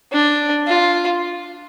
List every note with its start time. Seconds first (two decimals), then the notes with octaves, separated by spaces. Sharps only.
0.12 D4
0.67 F4